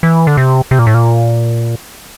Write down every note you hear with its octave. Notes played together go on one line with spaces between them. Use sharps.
E3
D3
C3
C3
A#2
A2
A#2